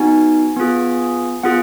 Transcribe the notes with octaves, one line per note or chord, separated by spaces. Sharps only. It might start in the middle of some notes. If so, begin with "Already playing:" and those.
Already playing: B3 D#4 F#4 G#5
B3 F4 G#4
B3 F4 G#4 F#5